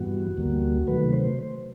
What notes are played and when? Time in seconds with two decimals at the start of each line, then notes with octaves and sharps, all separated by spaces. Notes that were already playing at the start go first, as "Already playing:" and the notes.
Already playing: G2 E3 G3 B3 F#4
0.37 D2 D3 G3 A#3
0.87 C3 D#3 F#3 A3 B4
1.13 C5